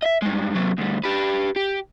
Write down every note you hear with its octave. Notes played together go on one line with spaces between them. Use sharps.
D#5 E5
G2 G#3
C3 F#3
D2 G3
G4 B4
G4